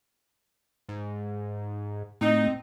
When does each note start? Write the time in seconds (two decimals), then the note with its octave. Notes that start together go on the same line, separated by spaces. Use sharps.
0.89 G#2
2.21 A2 C4 D#4